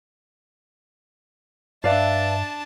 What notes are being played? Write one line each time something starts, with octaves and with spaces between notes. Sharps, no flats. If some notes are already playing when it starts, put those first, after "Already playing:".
G2 D4 B4 D5 E5 F5 A5